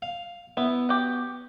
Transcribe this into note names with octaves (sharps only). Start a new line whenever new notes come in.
F5
B3 E4
F#4 G4